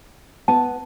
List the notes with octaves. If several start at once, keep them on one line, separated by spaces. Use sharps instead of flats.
B3 A5